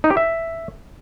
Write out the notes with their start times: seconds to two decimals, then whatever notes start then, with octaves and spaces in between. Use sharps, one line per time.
0.04 D#4
0.10 G4
0.17 E5